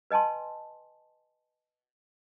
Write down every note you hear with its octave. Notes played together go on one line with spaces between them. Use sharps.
B4 D#5 G#5 A5 C6